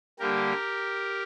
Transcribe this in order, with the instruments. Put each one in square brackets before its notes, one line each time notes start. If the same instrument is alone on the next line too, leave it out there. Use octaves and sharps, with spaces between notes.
[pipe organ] D3 G3 A#3 G4 A#4